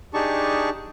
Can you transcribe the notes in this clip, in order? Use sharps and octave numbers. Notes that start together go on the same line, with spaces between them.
D4 D#4 G4 G#4 A5 C#6